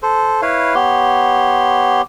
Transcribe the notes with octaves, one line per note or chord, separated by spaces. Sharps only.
A4 C5
E4 B4 C#5 F5
B3 G4 C#5 C6